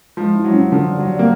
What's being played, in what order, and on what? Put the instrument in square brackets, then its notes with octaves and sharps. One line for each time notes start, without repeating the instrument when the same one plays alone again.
[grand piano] F3 [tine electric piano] G#3
[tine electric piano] E4
[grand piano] F#3
[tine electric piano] C#4
[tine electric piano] D3 [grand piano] F3
[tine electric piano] G3
[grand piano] F#3
[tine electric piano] G3
[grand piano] A#3